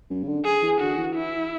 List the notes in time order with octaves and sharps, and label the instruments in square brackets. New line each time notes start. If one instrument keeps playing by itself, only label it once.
[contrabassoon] F#2
C#3
D3
[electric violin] G#4
[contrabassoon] E3
[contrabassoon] D3 [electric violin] F#4
[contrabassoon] E3
[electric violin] E4